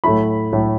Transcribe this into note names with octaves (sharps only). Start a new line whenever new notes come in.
A2 F#3 A3 E4 B5
A2 F#3 A3 E4